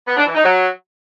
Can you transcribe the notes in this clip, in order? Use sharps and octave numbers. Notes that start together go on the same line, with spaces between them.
B3
D4
E3
D#4
F#3